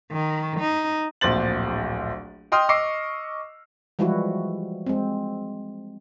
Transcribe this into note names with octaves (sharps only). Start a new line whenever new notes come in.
D#3
D#4
D1 A#1 C5 A6 F#7
D#5 G5 C6 D#6 F6
D#5 C#6 D6 E6 C7
E3 F3 G3 G#3 E4 F#4
G#3 C4